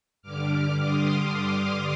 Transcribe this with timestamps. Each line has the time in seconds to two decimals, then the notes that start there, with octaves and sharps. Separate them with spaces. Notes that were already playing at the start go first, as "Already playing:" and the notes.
0.22 G2 D3 G3 D6 F6
0.83 C6 D#6
1.44 D6 F6